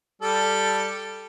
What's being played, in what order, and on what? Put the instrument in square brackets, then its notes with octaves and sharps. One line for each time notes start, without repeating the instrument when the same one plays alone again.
[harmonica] G3 A4